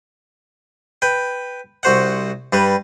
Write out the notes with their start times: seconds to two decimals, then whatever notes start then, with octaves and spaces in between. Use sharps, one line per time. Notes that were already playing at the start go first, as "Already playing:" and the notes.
1.02 B4 G5
1.83 C2 F#4 C5 F#5
2.53 G2 G3 B4